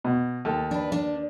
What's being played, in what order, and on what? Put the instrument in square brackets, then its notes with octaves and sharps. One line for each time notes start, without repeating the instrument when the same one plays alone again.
[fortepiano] B2
D#2 A4
[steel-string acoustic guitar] D4 B4
D4